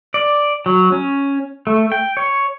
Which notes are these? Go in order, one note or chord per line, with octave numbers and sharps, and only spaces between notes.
D5
F#3
C#4
A3
G5
C#5